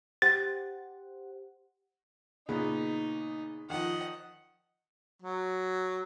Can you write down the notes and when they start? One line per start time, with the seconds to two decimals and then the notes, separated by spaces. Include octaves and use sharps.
0.22 G4 C5 F#5 A6
2.49 A#2 C#3 B3 D#4
3.70 D#3 F3 D#5 F#5
5.22 F#3